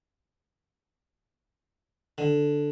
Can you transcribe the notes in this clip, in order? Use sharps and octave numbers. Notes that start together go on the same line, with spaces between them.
D3